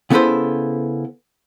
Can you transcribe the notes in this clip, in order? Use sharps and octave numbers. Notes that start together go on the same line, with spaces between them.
C#3 B3 E4 A4 B4 C5